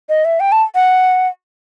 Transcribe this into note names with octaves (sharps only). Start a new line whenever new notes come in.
D#5
E5
G5
A5
F#5